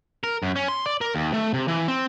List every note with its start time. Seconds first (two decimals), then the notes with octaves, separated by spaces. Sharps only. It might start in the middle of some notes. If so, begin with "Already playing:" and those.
0.23 A#4
0.43 F#2
0.56 C#4
0.68 C6
0.86 D5
1.01 A#4
1.15 D#2
1.34 A3
1.54 C3
1.68 E3
1.88 C4